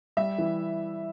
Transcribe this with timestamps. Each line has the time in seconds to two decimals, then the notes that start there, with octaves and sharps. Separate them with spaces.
0.17 G3 E5
0.38 E3